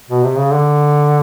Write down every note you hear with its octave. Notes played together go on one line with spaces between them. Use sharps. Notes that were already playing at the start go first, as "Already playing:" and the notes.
B2
C3
C#3
D3